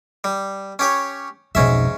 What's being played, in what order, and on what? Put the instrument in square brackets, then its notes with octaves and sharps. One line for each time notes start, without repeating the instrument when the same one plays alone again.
[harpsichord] G3
C#4 G4 C#5
[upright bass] B1 F2 [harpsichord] G#2 C#4 E5